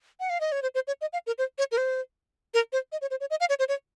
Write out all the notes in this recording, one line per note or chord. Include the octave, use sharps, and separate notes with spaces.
F#5
F5
D#5
C#5
C5
C5
C#5
D#5
F5
A#4
C5
C#5
A#4
C5
A#4
C5
D#5
C#5
C5
C#5
D#5
F5
C#5
C5
C#5